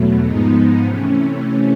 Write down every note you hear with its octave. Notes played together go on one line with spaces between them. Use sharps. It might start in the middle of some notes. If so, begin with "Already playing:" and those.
Already playing: E2 B2 F#3 A3
G#2 F3 G#3 B3 D#4
C3 E3 A3 C#4